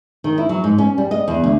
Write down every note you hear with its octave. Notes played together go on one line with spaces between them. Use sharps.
D#3
E4
F#3
G#2
C#4
G3
D#5
E2
D2